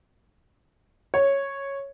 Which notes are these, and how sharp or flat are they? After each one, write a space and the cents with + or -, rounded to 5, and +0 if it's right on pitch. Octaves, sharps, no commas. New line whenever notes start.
C#5 -5